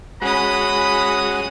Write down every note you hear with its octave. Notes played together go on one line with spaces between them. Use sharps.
G#3 C#4 F#4 B5 D#6